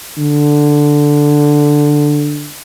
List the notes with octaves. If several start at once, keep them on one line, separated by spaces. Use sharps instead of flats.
D3